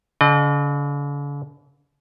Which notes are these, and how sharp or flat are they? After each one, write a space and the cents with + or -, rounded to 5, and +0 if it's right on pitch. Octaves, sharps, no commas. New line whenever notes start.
D3 -45 D#5 -45